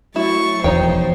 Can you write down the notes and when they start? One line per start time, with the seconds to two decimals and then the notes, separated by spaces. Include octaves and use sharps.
0.16 F#3 A3 E4 C#6 A6
0.64 E1 E2 B2 F3 D#4 C5 C#5 G5